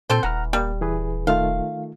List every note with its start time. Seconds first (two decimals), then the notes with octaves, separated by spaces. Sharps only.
0.10 A#2 C4 A4 C5
0.23 D#1 E3 F#5 A#5 F6
0.53 G3 A#3
0.81 E3 G#4 B4
1.27 D#3 A3 F4 F5